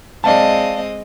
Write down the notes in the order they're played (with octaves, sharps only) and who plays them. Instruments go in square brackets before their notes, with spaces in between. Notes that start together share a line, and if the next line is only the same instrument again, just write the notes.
[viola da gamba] G#3 C4 D#5 [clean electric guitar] D5 F5 A5